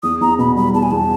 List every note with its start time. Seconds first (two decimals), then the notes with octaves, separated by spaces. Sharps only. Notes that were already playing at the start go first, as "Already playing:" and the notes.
0.03 E2 D#6
0.21 E2 A#5
0.39 B2 B5
0.56 G3 B5
0.74 E2 A5
0.83 G#5
0.91 E2 A5